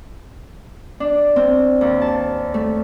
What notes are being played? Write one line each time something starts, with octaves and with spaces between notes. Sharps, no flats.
D4
C4
D#2
A5
A3